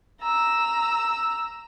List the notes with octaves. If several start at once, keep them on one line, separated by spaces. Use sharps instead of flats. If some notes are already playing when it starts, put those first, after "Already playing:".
A#5 E6